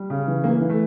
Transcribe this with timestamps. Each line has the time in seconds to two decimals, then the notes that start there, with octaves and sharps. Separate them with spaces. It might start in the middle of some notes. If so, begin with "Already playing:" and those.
Already playing: G3
0.10 C#3
0.27 E3
0.44 E3 A#3
0.61 E3
0.70 A3